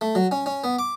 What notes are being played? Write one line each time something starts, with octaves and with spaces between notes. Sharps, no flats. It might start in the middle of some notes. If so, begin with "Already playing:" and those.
A3
F#3
C#4
C#4
B3
D6